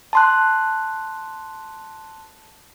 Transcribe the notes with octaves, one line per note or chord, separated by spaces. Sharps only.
A5 C6 F#6